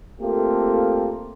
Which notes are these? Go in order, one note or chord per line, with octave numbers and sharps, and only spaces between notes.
A3 A#3 C4 F4 G4 A4